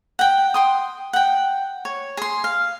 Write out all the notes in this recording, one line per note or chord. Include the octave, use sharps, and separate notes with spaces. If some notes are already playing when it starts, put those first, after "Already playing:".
F#5 G5
G5 C6 D#6
F#5 G5
C#5
G#4 C6
F5